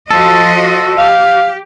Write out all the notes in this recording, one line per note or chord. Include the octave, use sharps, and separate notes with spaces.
F3 F#4 A4 D#5
G4 F5